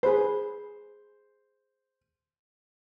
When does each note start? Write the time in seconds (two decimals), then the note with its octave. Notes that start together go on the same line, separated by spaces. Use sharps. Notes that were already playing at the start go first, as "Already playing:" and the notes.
0.03 G#4 B4 C5